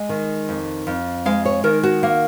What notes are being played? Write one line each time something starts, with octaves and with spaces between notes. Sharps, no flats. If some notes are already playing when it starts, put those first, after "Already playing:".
Already playing: G#3 D#5
D#3
F2
F2
G#3 F5
C#5
D#3 A#4
F#4
A#3